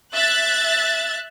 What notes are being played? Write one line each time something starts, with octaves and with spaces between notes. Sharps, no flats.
E5 F#6 A6